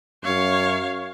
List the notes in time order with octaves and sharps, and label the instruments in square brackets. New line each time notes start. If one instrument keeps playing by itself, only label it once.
[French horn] F#2 [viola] C#5 F5